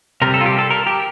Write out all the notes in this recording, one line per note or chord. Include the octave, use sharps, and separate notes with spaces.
C3 G3 A#4
A4
F4
G4
A4
A#4
G4